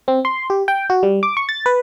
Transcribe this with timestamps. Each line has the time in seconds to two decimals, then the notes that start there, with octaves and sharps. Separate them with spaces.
0.08 C4
0.25 C6
0.50 G4
0.68 G5
0.90 F#4
1.03 G3
1.23 D6
1.37 C#6
1.49 A6
1.66 B4